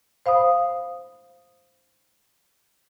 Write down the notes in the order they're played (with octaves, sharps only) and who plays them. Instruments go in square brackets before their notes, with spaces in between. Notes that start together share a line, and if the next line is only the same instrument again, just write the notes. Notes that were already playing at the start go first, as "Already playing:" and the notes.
[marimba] C5 F5 B5 D#6